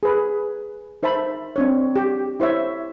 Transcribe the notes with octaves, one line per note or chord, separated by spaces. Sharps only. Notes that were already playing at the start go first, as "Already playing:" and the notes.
G#4 B4
D#4 C5 E5 A5 B5
C4 D4 C#5
G4
E4 C5 C#5 E5